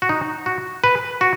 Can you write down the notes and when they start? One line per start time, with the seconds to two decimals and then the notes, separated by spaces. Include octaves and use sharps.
0.02 F#4
0.09 D#4
0.46 F#4
0.84 B4
1.21 F#4